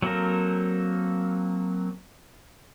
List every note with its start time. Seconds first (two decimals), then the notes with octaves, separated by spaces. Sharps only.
0.02 F#3 A#3 C4 A4 A#4